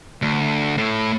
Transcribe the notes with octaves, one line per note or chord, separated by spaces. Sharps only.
D2
A2